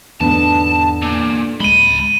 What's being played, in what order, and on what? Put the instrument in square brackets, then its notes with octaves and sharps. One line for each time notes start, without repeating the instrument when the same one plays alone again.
[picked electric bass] E2 G#2 [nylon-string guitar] D3 B3 D4 [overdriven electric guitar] A5
[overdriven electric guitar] A#2
[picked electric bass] D1 G#3 [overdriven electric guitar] C#2 B5 [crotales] D#7 G7